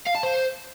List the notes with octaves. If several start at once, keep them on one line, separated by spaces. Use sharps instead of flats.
F5
A5
C5